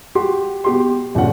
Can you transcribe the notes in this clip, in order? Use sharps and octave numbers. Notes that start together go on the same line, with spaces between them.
F#4 G4 C6
B2 G4 C6
D#1 C#2 G2 C#4 F#5